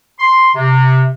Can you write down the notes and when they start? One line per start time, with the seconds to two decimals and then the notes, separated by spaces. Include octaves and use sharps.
0.19 C6
0.55 C3